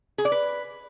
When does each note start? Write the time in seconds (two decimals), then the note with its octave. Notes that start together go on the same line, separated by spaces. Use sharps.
0.18 G#4
0.25 D5
0.32 B4